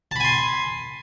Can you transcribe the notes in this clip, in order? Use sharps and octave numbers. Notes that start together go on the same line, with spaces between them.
G#5 A5 B5 C6